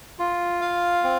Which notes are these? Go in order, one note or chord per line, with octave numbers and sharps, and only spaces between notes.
F4
F5
C4